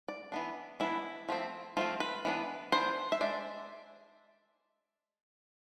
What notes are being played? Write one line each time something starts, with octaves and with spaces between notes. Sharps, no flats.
D5
E3 B3 D4
E3 B3 D4 E4
F3 A3 C4
F3 A3 C4 F4
B4
E3 B3 D4
E3 B3 D4 C5
E5
G#3 D4 D5